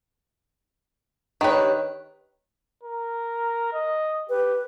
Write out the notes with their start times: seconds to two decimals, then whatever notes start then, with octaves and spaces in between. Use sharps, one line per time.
1.41 D#3 D4 G4 B4 C#5
2.84 A#4
3.73 D#5
4.29 G4 B4